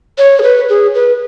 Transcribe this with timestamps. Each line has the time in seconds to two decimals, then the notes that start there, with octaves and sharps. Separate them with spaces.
0.18 C#5
0.39 G#4
0.43 B4
0.69 G#4
0.94 B4